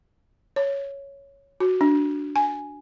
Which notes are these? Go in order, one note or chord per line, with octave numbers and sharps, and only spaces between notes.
C#5
F#4
D4
G#5